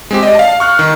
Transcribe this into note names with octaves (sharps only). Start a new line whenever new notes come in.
G#3 C4 G4
D5 D#5
F5 A5
C#6 F6 F#6
D#3